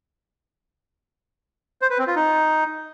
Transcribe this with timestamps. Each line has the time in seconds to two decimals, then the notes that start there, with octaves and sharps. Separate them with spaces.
1.82 C5
1.90 B4
1.99 C4
2.07 F4
2.16 D#4